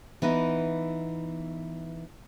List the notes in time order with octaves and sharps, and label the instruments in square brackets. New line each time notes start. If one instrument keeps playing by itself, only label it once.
[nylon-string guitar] E3 B3 D#4 E4